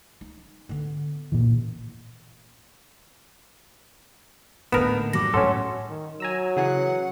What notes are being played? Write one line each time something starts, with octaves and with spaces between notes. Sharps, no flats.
D#4
D3 B3
A#2 E3
A2 D3 A#3 B3 D#4 A#4 E7
F#3 G3 D6 A#6
A2 C#4 A4 C#5 F#5 C6
D#3
F#3 G#5 A#5 E6
C#3 E3 G#4 F#5